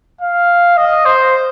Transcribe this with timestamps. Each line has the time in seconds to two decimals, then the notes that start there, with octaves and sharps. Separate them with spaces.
0.21 F5
0.77 D#5
1.05 C5